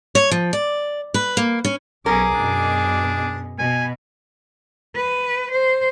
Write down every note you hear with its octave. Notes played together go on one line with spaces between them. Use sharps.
C#5
F3
D5
B4
A#3
C#4
B1 C#4 G#4 A#4 D6
F#2 B2 D4
B2 G#5
B4
C5